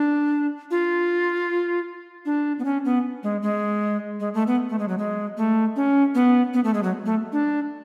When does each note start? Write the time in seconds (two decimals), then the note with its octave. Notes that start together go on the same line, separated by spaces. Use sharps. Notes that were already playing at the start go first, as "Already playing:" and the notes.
Already playing: D4
0.71 F4
2.26 D4
2.59 B3
2.65 C#4
2.85 B3
3.23 G#3
3.42 G#3
4.20 G#3
4.34 A3
4.47 B3
4.70 A3
4.79 G#3
4.88 F#3
4.98 G#3
5.37 A3
5.76 C#4
6.15 B3
6.54 B3
6.64 A3
6.74 G#3
6.83 F#3
7.06 A3
7.32 D4